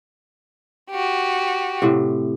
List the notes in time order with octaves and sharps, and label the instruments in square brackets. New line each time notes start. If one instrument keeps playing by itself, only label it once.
[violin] F#4 G4
[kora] A2 C3